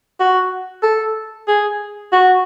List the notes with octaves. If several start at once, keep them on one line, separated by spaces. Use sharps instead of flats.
F#4
A4
G#4
F#4